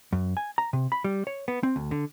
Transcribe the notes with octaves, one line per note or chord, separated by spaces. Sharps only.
F#2
G#5
A#5
C3
B5
G3
C#5
B3
C4
D2
D3